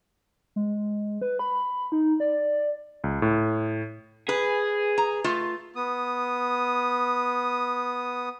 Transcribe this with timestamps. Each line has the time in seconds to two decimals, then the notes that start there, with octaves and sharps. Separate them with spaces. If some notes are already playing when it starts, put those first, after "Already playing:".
0.56 G#3
1.21 B4
1.39 B5
1.92 D#4
2.20 D5
3.04 C#2
3.22 A2
4.29 G#4 B4
4.98 A#5
5.24 A3 F4
5.76 B3 D#6